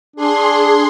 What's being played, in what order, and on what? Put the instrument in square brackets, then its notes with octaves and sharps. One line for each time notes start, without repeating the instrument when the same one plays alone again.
[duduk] D4 [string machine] G#4 C6